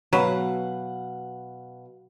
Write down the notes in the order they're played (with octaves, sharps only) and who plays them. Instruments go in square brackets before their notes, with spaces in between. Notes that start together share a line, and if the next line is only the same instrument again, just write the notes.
[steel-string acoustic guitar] B2 F5 F#5 [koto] F#3 B4